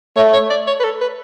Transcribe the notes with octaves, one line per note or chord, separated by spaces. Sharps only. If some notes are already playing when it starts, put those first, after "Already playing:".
A3 C#5
C#5
D5
C#5
B4
A4
B4